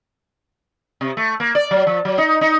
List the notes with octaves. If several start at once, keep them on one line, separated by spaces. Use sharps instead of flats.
C3
A3
A#3
D5
F#3
F3
F#3
D#4
D#4